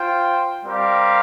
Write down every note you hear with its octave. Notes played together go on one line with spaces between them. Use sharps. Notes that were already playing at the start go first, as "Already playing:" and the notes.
Already playing: F4 C5 G5
G3 C4 G4 A#4 F5